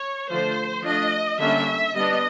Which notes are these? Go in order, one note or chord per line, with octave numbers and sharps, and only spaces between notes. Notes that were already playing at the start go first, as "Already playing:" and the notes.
Already playing: C#5
D3 F3 A3 C5
F3 A3 D4 D#5
D3 G3 A#3 C#4 E5
G3 B3 D4 D#5